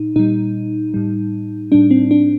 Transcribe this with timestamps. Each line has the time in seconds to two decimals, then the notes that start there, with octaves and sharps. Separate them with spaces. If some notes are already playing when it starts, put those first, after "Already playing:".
Already playing: A#2 D#4
0.16 A#2 G3 D#4
0.94 A2 G3
1.72 A2 G3 D4
1.91 C4
2.11 D4